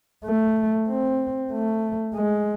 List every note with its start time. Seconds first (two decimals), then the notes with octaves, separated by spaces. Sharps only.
0.25 A3
0.89 C4
1.52 A3
2.16 G#3